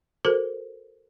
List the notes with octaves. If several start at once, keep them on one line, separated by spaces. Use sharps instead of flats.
F#4 A4 A#4 C5